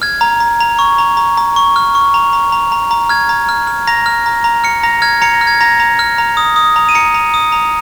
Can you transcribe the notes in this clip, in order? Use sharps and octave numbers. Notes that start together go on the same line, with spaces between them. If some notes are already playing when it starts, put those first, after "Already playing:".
F6 G#6
A#5
A#5
A#5
C#6
A#5
A#5
A#5
C#6
F6
C#6
A#5
A#5
A#5
A#5
A#5
F6 G#6
A#5
F6
F6
A#5 A#6
F6
A#5
A#5
F6 C#7
A#5 A#6
F6 G#6
A#5 C#7
A#6
F6
G#6
A#5 A#6
A#5
F6
A#5
D#6
D#6
A#5
D#7
A#5 C#7
A#5
D#6
A#5